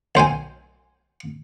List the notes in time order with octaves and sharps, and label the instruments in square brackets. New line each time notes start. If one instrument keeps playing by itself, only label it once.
[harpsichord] B1 C5 G5 G#5